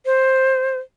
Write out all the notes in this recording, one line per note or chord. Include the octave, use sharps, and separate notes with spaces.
C5